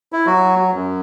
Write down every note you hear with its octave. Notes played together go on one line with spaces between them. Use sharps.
E4
F#3 F#4
F#2